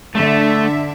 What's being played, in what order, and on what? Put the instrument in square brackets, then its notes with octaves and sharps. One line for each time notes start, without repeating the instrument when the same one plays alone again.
[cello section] D3 E5 [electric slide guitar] A3